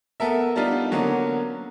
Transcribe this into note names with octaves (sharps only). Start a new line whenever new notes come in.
B3 A4 A#4 E5
G3 B3 D4 D#4 F4
D3 F#3 A#3 B3 C#4